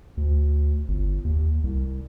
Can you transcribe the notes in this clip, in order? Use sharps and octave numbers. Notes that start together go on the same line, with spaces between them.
D2
G1
D#2
C2